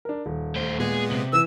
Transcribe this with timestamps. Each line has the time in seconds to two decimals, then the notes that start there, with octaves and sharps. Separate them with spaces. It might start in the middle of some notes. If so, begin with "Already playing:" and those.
0.05 D4 A#4
0.26 D#1
0.56 A3 C5
0.80 A#2 G#3 B3 G#4
1.11 C3 F#7
1.33 E3 E6